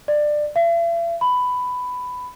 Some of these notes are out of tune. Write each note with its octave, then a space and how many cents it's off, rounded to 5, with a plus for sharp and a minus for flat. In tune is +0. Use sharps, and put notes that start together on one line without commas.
D5 +20
E5 +45
B5 +10